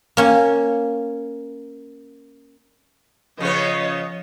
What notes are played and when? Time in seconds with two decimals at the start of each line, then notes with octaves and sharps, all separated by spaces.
0.17 A#3 C#4
3.40 C#3 F3 B3 C#5 D#5